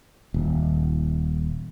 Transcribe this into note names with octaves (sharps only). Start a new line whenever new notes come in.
D#1